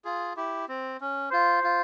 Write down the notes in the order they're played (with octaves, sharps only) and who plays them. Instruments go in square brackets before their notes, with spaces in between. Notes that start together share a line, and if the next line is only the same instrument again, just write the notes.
[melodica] F4 G#4
E4 G4
C4
C#4
[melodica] F4 [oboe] C5
[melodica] F4